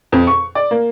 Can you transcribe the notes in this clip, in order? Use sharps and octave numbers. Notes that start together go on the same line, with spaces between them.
F2
C#6
D5
A#3